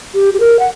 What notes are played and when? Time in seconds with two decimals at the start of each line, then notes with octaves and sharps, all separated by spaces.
0.15 G4
0.34 G4
0.40 A#4
0.59 F#5